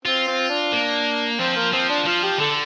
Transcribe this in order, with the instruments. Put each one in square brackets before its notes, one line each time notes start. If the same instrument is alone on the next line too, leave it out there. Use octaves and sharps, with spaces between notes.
[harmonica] C4 [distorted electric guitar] F4
[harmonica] C4
D4
[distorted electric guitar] A#3
[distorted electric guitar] F3 [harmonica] C4
[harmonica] A#3
[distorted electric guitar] F3 [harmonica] C4
[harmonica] D4
[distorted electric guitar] F3 [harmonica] F4
[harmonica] G4
[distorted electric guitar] D3 [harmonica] A4